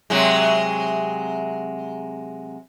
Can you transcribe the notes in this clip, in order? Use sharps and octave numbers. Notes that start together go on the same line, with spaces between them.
C3 F#3 G#3